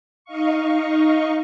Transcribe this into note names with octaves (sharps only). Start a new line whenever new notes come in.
D#4 D#5 F5 C#6